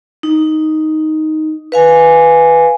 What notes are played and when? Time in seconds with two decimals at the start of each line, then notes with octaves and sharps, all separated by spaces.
0.23 D#4
1.72 B4 F5 G#5